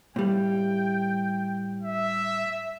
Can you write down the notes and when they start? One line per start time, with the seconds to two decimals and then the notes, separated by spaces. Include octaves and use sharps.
0.16 A2 G3 G5
1.82 E5